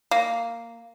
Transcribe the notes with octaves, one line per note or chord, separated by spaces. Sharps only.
A#3